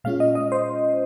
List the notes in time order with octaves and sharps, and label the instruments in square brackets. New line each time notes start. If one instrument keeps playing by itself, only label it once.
[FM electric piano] A#2 G#3 C#4 F4 F5
D#5
D#5
C5